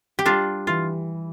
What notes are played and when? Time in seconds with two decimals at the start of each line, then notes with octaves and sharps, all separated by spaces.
0.19 G4
0.26 G3 D4 F4
0.67 E3 F4